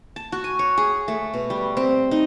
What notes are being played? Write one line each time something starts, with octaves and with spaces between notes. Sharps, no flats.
A5
F#4
G#5
C#5
G#4
A3
B2
G3
C4
D#4